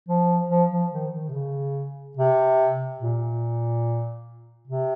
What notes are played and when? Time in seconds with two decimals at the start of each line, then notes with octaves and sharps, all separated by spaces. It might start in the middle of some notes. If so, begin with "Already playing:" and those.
0.08 F3
0.49 F3
0.71 F3
0.92 D#3
1.13 D#3
1.29 C3
1.34 C#3
2.17 C3
3.00 A#2
4.67 C3